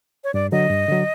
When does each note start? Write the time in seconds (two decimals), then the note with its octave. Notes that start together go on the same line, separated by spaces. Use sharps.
0.24 C#5
0.34 G2 D5
0.52 D3 F#3 D#5
0.70 G2
0.88 D3 F#3